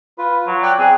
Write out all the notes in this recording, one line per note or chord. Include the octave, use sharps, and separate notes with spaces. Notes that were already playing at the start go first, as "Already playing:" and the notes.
F4 B4
F#3
D5 G5 F#6
C4 G#4